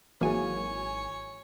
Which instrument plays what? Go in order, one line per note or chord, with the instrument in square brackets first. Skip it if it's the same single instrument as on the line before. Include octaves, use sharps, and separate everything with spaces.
[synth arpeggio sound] G#1 G#5 [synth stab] E3 F#3 [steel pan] A#3 G#4 [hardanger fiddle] C#5